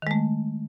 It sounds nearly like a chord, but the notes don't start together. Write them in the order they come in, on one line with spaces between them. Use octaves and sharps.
D#3 G#3 A3